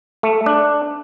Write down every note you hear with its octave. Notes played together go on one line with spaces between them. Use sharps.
A3
D4